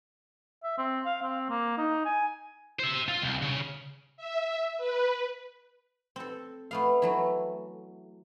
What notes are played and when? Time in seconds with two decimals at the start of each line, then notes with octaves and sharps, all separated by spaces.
0.63 E5
0.78 C4
1.05 F5
1.22 C4
1.50 A#3
1.78 D#4
2.05 G#5
2.80 C5 E5
3.08 F4
3.22 C2
3.42 C#3
4.17 E5
4.78 B4
6.16 C4 A4
6.71 A3 B3 F5
7.02 E3 F#3 A3